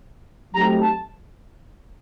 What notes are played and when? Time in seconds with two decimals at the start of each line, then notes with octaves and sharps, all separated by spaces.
0.54 F#3 A3 C4 D#4 G4 A#5
0.81 A5